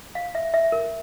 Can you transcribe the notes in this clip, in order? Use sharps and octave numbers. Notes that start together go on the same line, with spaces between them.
F5
E5
E5
A#4